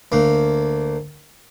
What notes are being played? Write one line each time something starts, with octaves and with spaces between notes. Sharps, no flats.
D2 A#3